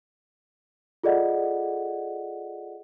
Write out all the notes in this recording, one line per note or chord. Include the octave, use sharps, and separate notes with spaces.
F4 G#4 A4 D5 D#5 F#5